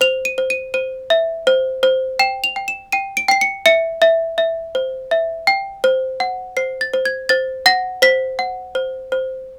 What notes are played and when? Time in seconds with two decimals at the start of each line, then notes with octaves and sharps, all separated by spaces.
0.01 C5 F7
0.25 D#7
0.38 C5
0.50 D#7
0.74 C5 D#7
1.10 E5
1.47 C5
1.83 C5
2.19 G5 E7
2.44 F7
2.56 G5
2.68 E7
2.92 G5 D#7
3.17 D7
3.28 G5 C7
3.41 C#7
3.66 E5 C#7
4.02 E5
4.38 E5
4.75 C5
5.11 E5
5.47 G5
5.84 C5
6.20 F#5
6.57 C5 C7
6.81 A6
6.94 C5
7.05 G#6
7.29 C5 A6
7.66 F#5 A#6
8.02 C5 B6
8.39 F#5
8.75 C5
9.12 C5